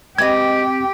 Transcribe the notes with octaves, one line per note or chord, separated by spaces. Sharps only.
G#3 C4 G4 B4 D#5 G#6